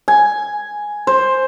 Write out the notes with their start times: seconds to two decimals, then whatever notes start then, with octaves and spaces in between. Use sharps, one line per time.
0.08 G#5
1.07 C5